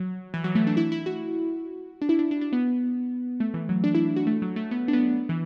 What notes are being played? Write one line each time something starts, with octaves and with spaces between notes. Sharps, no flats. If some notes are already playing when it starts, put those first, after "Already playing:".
Already playing: F#3
E3
F#3
A3
D4
E4
E4
F#4
D4
E4
D4
D4
D4
B3
A3
E3
F#3
D4
E4
F#4
A3
F#3
A3
B3
D4
B3
E3